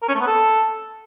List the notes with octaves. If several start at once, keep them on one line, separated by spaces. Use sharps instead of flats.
A#4
C#4
A3
B3
A4